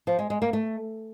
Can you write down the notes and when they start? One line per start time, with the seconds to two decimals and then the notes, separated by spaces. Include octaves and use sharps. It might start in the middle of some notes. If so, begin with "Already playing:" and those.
0.07 F3
0.19 G#3
0.30 G#3
0.42 A#3
0.53 A3